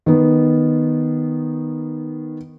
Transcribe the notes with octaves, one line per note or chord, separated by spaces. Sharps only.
D#3 B3